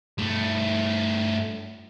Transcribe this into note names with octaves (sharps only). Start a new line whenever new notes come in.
G2 A3